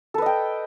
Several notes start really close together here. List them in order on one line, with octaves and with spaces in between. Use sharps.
A4 B4 D#5 G5